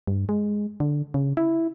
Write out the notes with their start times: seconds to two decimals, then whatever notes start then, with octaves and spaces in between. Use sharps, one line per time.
0.07 G2
0.29 G#3
0.80 D3
1.14 C#3
1.37 E4